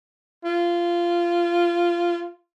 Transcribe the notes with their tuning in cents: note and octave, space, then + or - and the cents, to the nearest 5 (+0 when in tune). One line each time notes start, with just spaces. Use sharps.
F4 -15